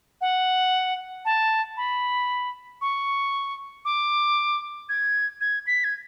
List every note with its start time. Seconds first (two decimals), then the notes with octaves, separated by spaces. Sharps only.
0.21 F#5
1.25 A5
1.77 B5
2.81 C#6
3.85 D6
4.89 G#6
5.41 G#6
5.67 B6
5.84 G#6